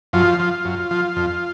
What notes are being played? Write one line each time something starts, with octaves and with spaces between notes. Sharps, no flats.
F#2 F3 F4
F3
F#2
F3
F2